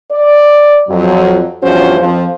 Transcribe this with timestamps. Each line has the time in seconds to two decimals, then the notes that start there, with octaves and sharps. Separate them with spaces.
0.12 D5
0.89 F2 F#3
1.63 E2 G2 F3 C#4 F#4 C5
2.01 F2 F3